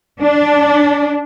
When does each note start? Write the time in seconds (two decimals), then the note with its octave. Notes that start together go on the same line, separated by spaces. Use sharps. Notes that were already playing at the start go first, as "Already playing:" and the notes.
0.20 D4